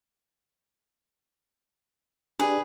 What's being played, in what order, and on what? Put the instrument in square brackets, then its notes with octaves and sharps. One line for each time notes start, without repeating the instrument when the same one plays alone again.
[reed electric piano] D4 G4 D5 [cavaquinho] G#4 B4